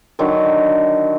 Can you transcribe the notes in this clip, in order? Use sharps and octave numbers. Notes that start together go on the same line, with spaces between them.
D3 D#3 F#3